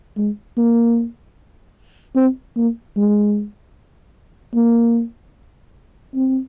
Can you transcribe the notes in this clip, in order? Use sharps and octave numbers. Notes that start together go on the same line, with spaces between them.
G#3
A#3
C4
A#3
G#3
A#3
C4